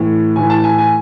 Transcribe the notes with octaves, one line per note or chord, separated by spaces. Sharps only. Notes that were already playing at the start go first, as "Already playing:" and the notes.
Already playing: A2 E3
A2 E3 G#5
A5
G#5
G#5